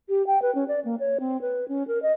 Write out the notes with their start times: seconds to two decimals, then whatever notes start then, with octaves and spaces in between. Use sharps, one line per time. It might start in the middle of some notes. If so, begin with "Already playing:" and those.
0.09 G4
0.27 G5
0.42 B4
0.55 C#4
0.68 D5
0.85 A#3
1.00 C#5
1.20 C4
1.42 B4
1.68 C#4
1.88 A#4
2.02 D#5